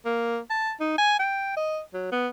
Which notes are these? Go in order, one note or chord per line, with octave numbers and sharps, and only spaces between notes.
A#3
A5
D#4
G#5
G5
D#5
F#3
B3